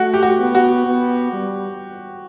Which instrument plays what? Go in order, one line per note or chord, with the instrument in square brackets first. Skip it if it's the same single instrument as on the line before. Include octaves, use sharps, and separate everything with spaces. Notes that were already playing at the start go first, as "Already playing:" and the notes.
Already playing: [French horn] A3 [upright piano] F#4
[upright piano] G4
F#4
[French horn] B3
[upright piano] F#4
[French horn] B3
G3